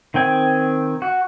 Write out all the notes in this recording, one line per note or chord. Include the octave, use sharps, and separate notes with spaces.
D#3 C4 G5 G#5
F#4